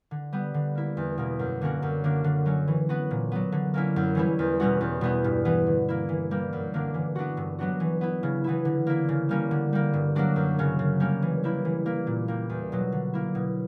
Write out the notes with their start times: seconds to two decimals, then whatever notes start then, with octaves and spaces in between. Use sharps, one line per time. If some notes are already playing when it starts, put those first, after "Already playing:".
0.11 D3
0.33 G3 B3
0.54 D3
0.75 A#3 E4
0.97 E2
1.18 B2 A#3
1.39 F#2
1.61 D3 A#3 C#4 F#4
1.82 F#2
2.04 D3 A#3 D4
2.24 D3
2.46 F#3 C#4
2.68 E3
2.89 B3 F#4
3.11 A#2
3.32 F#3 B3
3.52 D3
3.74 A#3 C#4 E4
3.96 F#2
4.15 E3 G3 C#4 E4
4.39 E2
4.60 B2 G3 C#4 F#4
4.81 E2
5.01 B2 G3 B3 E4
5.24 G2
5.45 E3 B3
5.66 D3
5.89 A#3 E4
6.09 E3
6.31 G3 A#3
6.53 F#2
6.74 D3 A#3 D4
6.94 E3
7.15 B3 D4 F#4
7.37 G2
7.59 F#3 B3 D4 F#4
7.80 E3
8.01 B3 E4
8.23 C#3
8.44 E3 B3 E4
8.65 D3
8.87 A#3 E4
9.09 C#3
9.29 G3 A#3 C#4
9.51 D3
9.73 G3 A#3
9.93 G2
10.15 F#3 A#3 D4 F#4
10.36 F#2
10.59 C#3 F#3 C#4
10.79 C#3
11.00 G3 A#3 C#4
11.22 E3
11.43 G3 A#3 E4
11.65 E3
11.86 A#3 E4
12.07 A#2
12.28 G3 A#3
12.49 E2
12.72 B2 F#3
12.92 D3
13.14 A#3 E4
13.35 B2